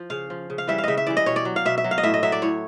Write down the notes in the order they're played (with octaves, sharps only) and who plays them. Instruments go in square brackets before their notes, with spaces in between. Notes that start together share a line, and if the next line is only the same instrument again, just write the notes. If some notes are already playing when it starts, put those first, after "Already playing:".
Already playing: [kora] F3
C#3 F5
F3
C#3
F5
E3 G3 E5
F5
C#3 D#5 E5
E5
E3 G3 D5
D#5
B2 C#5
D5
F#3
F5
B2 E5
E5
F#3
F5
D#5
A2 E5
D#5
F#3 E5
D5
A2 C#5